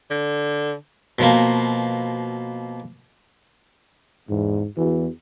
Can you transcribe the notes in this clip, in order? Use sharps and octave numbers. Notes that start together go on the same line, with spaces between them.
D3
B2 F3 A#3
E2 G#2
E2 E3 F#4